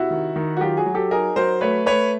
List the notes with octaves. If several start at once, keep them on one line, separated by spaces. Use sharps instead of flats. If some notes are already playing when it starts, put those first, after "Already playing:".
Already playing: C3 E4 F#4
D#3
D#3
F#4
F#3 F4 G4
F#4 G#4
F#3
G4 A4
D#4 G#4 A#4
F#3 A#4 C5
A3 B4 C#5
A3 B4 C#5